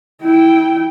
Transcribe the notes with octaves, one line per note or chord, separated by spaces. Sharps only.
E4 G5